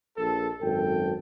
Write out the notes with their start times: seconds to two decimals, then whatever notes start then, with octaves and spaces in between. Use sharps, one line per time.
0.18 A#1 A4
0.61 G#1 F#2 A4 G5